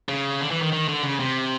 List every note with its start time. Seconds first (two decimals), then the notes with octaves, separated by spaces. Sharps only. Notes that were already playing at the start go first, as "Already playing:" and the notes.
0.09 C#3
0.41 D3
0.51 E3
0.62 D#3
0.73 D#3
0.88 D3
1.03 C#3
1.19 C3